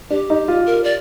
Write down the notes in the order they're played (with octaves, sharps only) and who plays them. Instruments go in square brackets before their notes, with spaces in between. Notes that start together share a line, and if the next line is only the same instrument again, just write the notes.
[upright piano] D4 [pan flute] G4
[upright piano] D#4
F4
[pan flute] A#4
D5